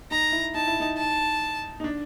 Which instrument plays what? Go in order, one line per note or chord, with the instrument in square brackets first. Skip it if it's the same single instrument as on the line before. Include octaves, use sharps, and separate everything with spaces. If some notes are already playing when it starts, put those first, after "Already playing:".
[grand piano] D#4 [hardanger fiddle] A#5
[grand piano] E4
[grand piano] D#4 [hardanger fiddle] A5
[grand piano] E4
D#4
[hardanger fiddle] A5
[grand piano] D#4
D4